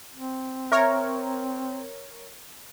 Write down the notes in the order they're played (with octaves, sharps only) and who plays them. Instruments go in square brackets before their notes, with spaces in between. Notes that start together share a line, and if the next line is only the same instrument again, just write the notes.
[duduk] C4
[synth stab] A#4 C#5 [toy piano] E5